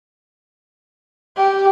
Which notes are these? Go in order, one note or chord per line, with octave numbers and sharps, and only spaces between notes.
G4